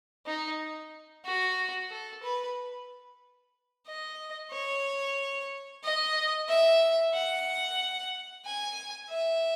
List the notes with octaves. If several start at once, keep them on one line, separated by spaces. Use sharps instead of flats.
D#4
F#4
A4
B4
D#5
C#5
D#5
E5
F#5
G#5
E5